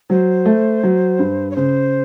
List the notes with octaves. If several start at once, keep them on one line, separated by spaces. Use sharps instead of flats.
F#3 C5
A3
F#3
G2
C#5
C#3 C5